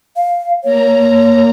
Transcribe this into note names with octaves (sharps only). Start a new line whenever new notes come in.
F5
A#3 C#5 A#5